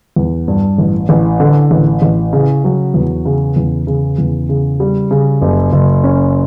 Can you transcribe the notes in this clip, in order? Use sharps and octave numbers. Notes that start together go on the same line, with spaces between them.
E2
G2
A1
A1
D3
A1
A1
C#3
F#3
E2
C#3
E2
C#3
E2
C#3
G3
C#3
F#1
F#1
C#4